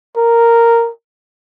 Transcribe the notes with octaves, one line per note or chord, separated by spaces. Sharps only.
A#4